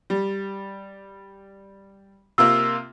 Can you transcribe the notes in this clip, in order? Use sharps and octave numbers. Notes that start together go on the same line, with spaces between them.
G3
C3 A#3 F4 E6